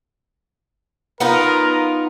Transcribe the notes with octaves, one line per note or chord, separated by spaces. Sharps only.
B3 D#4 F4 A#4